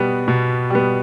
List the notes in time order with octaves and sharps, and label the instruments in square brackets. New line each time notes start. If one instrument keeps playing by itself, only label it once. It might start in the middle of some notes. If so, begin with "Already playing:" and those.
Already playing: [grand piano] B2 G3 B3
B2
G3 B3